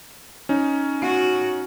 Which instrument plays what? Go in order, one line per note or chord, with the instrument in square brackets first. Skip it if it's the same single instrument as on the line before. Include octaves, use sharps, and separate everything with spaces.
[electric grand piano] C#4 D#4
[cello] F#4